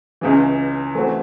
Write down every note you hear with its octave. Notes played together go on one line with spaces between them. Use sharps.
C#2 C#3 E3
E3 A3 C4 F#4